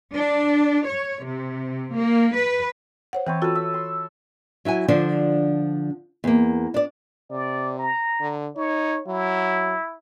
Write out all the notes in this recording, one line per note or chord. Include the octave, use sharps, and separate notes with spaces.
D4
C#5
C3
A#3
B4
C5 C#5 F#5
E3 C4 B4 C#5
F4 F#4 A4 B4
E5
C6
F#3 E4 F#4 G#5
D3 F3 D4 F4 C5
E2 A#3
D4 D5
C3 D5
A#5
D3
D#4 C#5
F#3 E4